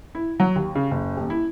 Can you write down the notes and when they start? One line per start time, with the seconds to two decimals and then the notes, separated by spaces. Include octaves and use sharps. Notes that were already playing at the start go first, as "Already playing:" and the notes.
0.15 E4
0.40 F#3
0.56 D#2
0.75 C#3
0.91 F#1
1.17 D#1
1.30 E4